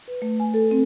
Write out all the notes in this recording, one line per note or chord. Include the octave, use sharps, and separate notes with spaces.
B4
A3
G#5
A4
C4